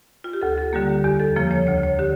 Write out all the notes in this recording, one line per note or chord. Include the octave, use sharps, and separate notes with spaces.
F4
G4
D2 A4
A4
D3 G3 A#3 G4
G4
E2 G4
A4
C#3 F3 A#3
C#5
D2 C#5
C#5
D3 G4